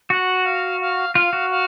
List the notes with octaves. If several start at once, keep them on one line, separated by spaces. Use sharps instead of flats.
F#4 F#5
F5
F5
F4 F5
F#4
F5